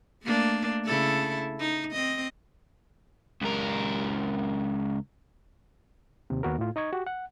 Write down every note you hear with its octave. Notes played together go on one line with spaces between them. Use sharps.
A3 A#3 D4
C#3 E4 A4
D#4
C4 D#5
C#2 A#4
D#2 C3
D#2 B3 F#4 A#4
A2 F4
D#4 D#5 C#6 G#6
F#4 G4
F#5